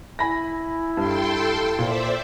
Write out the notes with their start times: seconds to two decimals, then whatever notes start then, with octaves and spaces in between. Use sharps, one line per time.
0.19 E4 G#5 B5 A#6
0.97 G2 A4 G5 C6
1.79 A#2 C5 D5 E5